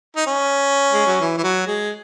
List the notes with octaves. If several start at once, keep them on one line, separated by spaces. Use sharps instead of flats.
D#4
C#4
G#3
F#3
E3
E3
F#3
G#3